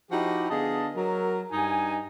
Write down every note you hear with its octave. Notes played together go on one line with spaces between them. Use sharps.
F3 D#4 E4 F#4 G4
D3 B3 G#4 D#5 F5 A5
F#3 A#4
G2 D#4 G#5